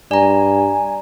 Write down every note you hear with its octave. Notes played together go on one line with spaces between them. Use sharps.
G2 D5 G#5 A#5